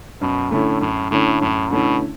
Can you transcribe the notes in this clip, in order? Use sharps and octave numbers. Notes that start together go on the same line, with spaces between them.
F#2 B2
A2 D3 A3 C#4 E4
F#2 A2
A2 D3 A3 C#4 E4
F#2 A2
B2 D3 A3 C#4 E4